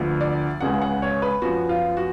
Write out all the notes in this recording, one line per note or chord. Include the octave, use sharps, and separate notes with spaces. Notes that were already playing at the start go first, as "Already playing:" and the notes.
Already playing: D2 D3 F3 B3
D5
C#2 C#3 G#3 B3 F#5
F#5
C#5
B4
F#2 F3 B3 F#4
F4
F#4